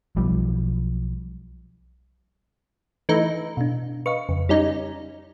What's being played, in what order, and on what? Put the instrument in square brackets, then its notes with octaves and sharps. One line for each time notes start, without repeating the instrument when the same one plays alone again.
[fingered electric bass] B1 F3 G3
[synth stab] E3 A3 D#4
[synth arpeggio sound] B2 D4
[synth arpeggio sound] B4 D#5 F5 [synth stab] C#6
[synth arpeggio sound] F2 C#3
[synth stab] G3 C#4 D#4